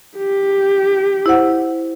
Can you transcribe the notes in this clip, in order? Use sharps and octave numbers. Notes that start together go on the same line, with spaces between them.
G4
E4 C5 F#5